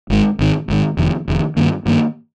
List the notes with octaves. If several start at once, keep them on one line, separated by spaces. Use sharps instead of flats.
G#1 G#2 D#3 G#3
G#1 G#2 D#3
G#1 G#2 D#3
F1 F2 D#3
F1 F2 D#3
G2 D#3 A#3
G2 D#3 A#3